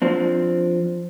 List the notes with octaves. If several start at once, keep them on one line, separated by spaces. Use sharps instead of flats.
F3 C4 D4